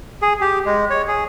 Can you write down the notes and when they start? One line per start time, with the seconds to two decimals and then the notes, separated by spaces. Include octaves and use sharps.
0.22 G#4
0.41 G4
0.66 G#3
0.90 C#5
1.08 G#4